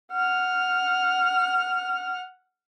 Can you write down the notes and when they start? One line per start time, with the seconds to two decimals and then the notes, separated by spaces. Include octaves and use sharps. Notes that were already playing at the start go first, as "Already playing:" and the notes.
0.13 F#5 F6